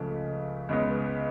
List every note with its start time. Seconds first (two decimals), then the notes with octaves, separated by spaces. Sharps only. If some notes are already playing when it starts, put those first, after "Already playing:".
Already playing: C#2 C#3 F3 A3
0.69 C#2 C#3 G#3 B3